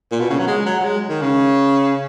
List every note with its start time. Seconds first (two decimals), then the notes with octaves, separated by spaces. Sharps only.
0.12 A#2
0.20 B2
0.30 C#3
0.39 F#3
0.47 G#3
0.66 F#3
0.81 F#3
0.85 G#3
1.09 D#3
1.22 C#3